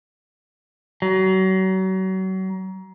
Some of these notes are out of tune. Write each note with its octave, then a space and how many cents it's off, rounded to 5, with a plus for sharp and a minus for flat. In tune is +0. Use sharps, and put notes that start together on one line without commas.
F#3 +35